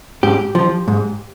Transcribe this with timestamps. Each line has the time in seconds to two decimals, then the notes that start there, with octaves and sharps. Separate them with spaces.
0.23 G#2 G4
0.55 F3
0.88 G#2